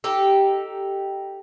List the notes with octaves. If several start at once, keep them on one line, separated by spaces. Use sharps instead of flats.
D#4 G4 A4